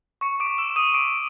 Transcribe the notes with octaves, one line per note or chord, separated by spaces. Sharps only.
C#6 C#7
D6 D7
C#6
E6 E7
E6
D#6 D#7
D6 D#6 D7